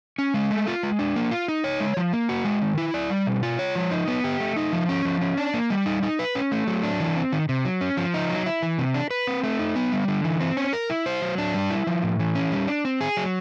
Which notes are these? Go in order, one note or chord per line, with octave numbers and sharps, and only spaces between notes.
C#4
G#3
A3
F4
G#3
D4
A#3
F4
D#4
C#5
G#3
F3
A#3
F#4
G#3
D#3
E4
D5
G3
B2
F4
C#5
F3
D#4
B3
G4
A3
D#4
F3
C#4
F3
C#4
D4
A#3
G3
D#4
D#4
B4
C#4
A3
F#3
D4
E3
C4
D#3
C3
F#3
C#4
F3
D#4
F#3
E4
E3
C3
D4
B4
C4
A3
D#4
B3
G3
D3
E3
C4
C#4
A#4
E4
C5
F#3
D4
G3
E4
F3
A2
E3
C#4
G3
D4
C4
G#4
F#3